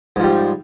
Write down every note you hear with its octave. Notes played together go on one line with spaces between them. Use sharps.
G#2 F3 G3